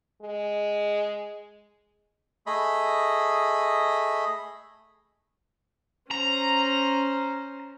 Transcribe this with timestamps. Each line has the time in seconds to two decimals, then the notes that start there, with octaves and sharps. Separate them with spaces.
0.22 G#3
2.47 A3 G#4 D#5 B5
6.11 C#4 C5 A#5